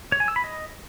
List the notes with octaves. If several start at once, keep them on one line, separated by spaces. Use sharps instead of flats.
C#5
G#5
E6
B5
D#5